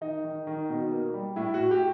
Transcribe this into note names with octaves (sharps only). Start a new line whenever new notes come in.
D#3 D#4
D#3
D#3
B2
A#3
G3
A2 E4
F#4
A2
G4